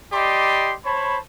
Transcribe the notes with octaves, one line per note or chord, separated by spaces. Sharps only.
G4 D5 D#5 B5 C6
C5 C#5 A5 B5